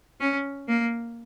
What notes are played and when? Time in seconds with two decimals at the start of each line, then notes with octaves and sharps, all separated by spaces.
0.20 C#4
0.69 A#3